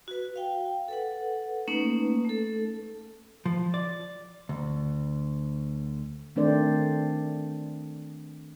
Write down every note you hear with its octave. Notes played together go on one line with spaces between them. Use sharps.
F#4 B4
F5 G5
A4 B4 F#5
A3 A#3 C#4 D#4 B4
A3 A4
F3
D5
D2
D#3 A3 C4 D4 C5 D5